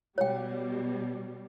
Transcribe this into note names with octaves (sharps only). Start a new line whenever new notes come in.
B2 G3 C#5 G5